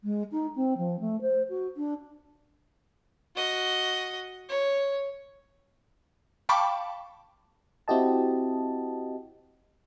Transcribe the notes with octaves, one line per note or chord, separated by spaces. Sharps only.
G#3
D#4
C4
F3
A3
C5
F#4
D4
F#4 D#5
C#5
F5 G5 A5 B5 C#6 D6
C4 E4 F#4 G4 D#5 A5